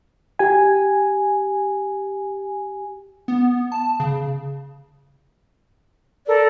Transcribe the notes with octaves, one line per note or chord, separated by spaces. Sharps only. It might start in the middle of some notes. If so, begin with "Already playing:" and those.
G4 G#5
B3
A5
C#3
A4 A#4 D5